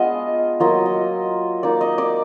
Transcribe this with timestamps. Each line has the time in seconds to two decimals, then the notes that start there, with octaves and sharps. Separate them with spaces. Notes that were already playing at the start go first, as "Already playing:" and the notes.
Already playing: G#3 B3 D4 F4 D#5 F5
0.60 F#3 A#3 F4 D#5
0.86 D#5
1.63 A#3 D#4 D5
1.81 D#5
1.98 D5